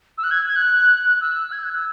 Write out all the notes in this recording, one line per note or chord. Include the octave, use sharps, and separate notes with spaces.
E6
F#6
G#6
G#6
F#6
E6
G#6
F#6
E6